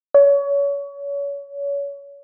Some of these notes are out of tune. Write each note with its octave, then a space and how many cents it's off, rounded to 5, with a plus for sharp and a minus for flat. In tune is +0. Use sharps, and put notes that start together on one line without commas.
C#5 +30